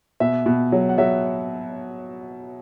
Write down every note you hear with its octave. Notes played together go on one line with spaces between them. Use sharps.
B2 E5
B2
F#3
F#5
F#3 E5